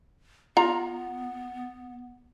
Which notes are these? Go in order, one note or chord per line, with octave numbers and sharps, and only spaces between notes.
B3 F4 A#5